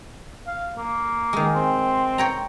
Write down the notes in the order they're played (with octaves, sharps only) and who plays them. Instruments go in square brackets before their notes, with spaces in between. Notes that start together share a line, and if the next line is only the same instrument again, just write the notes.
[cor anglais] F5
A#3
[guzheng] D#3 G#3
[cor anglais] C4
[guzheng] C#5 G5 A#5